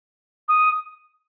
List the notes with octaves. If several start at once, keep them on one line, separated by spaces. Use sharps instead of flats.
D#6